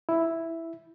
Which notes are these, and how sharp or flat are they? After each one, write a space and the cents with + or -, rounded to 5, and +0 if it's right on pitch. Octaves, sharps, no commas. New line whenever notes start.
E4 +0